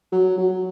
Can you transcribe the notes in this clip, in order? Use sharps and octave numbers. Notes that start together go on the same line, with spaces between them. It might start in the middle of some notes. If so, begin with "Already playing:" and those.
F#3
F#3